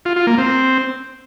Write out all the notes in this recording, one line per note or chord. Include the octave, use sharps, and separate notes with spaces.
F4
F4
A#3
C4